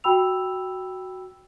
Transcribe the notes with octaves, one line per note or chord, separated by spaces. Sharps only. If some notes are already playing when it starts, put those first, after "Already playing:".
F#4 G5 B5 E6 F7